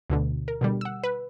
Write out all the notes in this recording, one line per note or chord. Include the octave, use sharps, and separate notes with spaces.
D2 B2 D3
A#4
B2 D3 G3
F#5 E6
B4